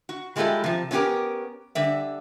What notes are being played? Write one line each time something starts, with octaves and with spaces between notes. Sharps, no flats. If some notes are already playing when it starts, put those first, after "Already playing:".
F#4
G3 G#3 E4 F4 G4 A4
C3 F3
B3 C#4 F4 G4 A#4
D3 G3 E5